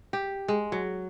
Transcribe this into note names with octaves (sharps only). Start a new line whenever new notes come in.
G4
G#3
F#3